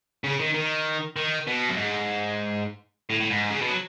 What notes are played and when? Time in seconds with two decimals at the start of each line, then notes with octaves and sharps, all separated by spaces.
0.24 C#3
0.40 D#3
0.54 D#3
1.16 D#3
1.47 B2
1.69 F#2
1.77 G#2
3.10 A2
3.20 A2
3.31 G#2
3.50 C#3
3.62 B2
3.69 F#3